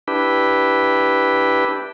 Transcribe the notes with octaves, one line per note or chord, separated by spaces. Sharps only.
D4 E4 G4 B4